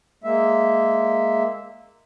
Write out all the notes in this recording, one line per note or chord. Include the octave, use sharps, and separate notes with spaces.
G#3 A#3 E5